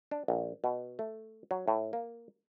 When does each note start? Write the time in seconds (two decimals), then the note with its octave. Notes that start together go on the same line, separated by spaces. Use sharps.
0.11 D4
0.28 A#1
0.64 B2
0.99 A3
1.51 F#3
1.68 A2
1.93 A#3